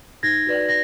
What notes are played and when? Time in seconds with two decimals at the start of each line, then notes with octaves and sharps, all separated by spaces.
0.23 D#4 G#6 A#6
0.46 F#4 B4 D5
0.69 A#6